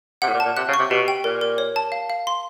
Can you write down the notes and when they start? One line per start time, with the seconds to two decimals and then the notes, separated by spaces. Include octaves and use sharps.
0.22 C3 F#5
0.28 A2
0.34 A#2
0.40 A5
0.45 A#2
0.57 C3 F#6
0.68 C#3
0.74 C#6
0.79 C3
0.91 B2 G4
1.08 G5
1.24 A#2 A#4
1.41 A#4
1.58 C#5
1.76 A5
1.92 F5
2.10 F5
2.27 C6